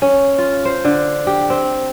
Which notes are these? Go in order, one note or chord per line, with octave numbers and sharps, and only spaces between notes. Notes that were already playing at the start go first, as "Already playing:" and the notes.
C#4
F4
C5
D3
G4
C4